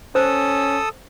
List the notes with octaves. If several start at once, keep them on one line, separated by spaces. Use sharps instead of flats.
C#4 A4 C5 D#6 E6